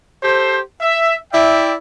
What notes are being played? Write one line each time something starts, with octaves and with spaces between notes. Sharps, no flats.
G4 A4 C5
E5
E4 D5 E5 G5